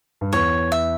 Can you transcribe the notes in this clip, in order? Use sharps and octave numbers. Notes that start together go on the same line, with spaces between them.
G2
E2 C#5
E5